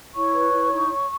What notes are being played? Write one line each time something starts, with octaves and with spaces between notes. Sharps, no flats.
E4 C#5 C#6
B4
E4
D#4
C#5